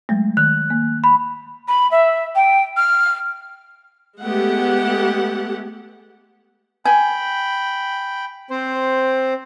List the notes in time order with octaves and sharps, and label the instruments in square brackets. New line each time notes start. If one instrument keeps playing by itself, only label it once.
[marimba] F#3 G#3 A3
[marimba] D#3 [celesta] F#6
[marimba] A#3
[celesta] B5
[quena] B5
E5
G5
F6
[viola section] G#3 A3 B3 G4 F#5
[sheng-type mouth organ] G5 B5 [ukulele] G#5
[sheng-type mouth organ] C4 C5